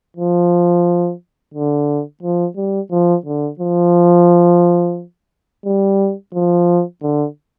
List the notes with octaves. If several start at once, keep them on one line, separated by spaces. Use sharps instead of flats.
F3
D3
F3
G3
F3
D3
F3
G3
F3
D3